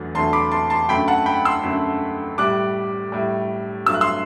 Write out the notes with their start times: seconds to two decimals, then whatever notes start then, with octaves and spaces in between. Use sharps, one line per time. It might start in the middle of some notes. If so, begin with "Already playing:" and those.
Already playing: E2 D3 F#3 A3
0.14 E2 D3 F#3 A3 A5 C6
0.33 B5 D6
0.51 A5 C6
0.70 A5 C6
0.89 F#2 D3 A3 G5 B5
1.08 F#5 A5
1.26 G5 B5
1.45 C6 E6
1.63 F#2 D3 A3
2.38 A2 G3 D6 F#6
3.12 A2 G3
3.86 G2 F#3 A3 E6
3.94 F#6
4.01 C6 E6